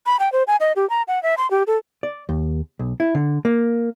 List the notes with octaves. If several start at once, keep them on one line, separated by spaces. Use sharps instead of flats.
B5
G5
C5
G#5
D#5
G4
A#5
F#5
E5
C6
G4
A4
D5
D#2
B1
E4
D3
A#3